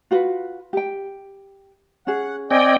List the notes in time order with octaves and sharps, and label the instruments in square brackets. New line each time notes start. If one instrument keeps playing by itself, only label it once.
[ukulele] F4 F#4 B4
G4 G5
[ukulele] C#4 G#4 [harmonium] F#5
[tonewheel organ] C4 D#5 G5 [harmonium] D5 G#5